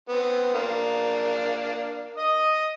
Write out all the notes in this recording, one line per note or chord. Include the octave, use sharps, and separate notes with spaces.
B3 C4
A#3 D4
D#5 D#6